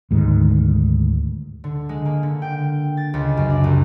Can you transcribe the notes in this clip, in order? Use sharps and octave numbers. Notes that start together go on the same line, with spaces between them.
D2 G#2 D#3
D3
G#3
A#3
D3
G5
A6
C#2
F#2
D4
C2